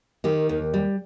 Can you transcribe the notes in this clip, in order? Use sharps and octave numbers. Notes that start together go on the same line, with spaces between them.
D#3 G4
D#2
G3